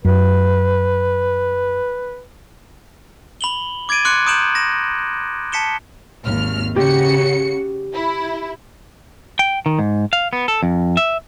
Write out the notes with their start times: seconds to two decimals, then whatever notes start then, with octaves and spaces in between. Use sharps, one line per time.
0.05 F#2 B4
3.41 B5 F#7 G7
3.89 D6 G#6 A6 D7 D#7
4.05 C6 D6 F#6 C#7
4.26 A#5 D#6 G6 D7 E7 F#7
4.55 A#6 E7
5.52 A5 B6 C#7 E7 G7
6.26 G#1 D#2 F6
6.76 C#3 F#4 G4 C#7
7.94 E4
9.39 G5
9.66 D#3
9.79 G#2
10.13 F5
10.33 B3
10.48 A4
10.63 F2
10.97 E5